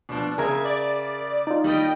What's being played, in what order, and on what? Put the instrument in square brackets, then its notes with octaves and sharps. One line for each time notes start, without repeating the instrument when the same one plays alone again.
[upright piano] B2 F3 [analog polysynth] D4
[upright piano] C#3 [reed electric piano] G#4 A#4 E5 [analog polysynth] G#6
[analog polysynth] D5
[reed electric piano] D#4 F4
[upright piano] D#3 G3 [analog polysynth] D#5 G5